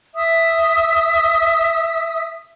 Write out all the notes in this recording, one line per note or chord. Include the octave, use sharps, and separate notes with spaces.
E5 D#6 E6